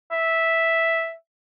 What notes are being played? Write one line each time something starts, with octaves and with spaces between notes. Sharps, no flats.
E5